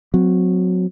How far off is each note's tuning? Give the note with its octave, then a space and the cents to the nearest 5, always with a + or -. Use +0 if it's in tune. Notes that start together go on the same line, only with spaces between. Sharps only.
F#3 -15 C4 -30